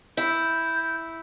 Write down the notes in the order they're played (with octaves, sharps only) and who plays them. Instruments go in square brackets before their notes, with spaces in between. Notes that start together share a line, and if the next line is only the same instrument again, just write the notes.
[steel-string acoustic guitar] E4 [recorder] G6